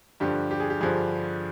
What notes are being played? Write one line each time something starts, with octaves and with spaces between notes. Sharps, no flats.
G2 D3 F3 G4
G4
G#4
G4
G2 D3 F3 G#4